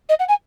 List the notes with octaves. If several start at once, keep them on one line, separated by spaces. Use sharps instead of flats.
D#5
F#5
G#5